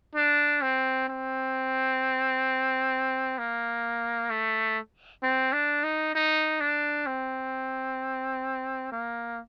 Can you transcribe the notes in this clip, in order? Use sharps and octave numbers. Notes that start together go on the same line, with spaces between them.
D4
C4
C4
A#3
A3
C4
D4
D#4
D#4
D4
C4
A#3